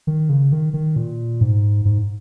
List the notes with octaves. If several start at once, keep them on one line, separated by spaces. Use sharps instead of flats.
D#3
C#3
D#3
D#3
A#2
G#2
G#2